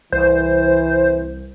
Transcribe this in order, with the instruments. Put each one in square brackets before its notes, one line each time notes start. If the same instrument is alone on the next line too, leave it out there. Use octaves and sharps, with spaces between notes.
[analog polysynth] C2 [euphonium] E3 [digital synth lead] C5